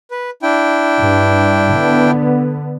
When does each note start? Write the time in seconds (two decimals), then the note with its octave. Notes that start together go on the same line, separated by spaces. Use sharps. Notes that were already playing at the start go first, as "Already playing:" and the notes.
0.11 B4
0.42 D4 E4 G5
0.99 G2
1.73 D3 B3